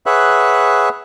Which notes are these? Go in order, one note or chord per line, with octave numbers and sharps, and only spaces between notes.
G#4 B4 C#5 E5 F#5 F#6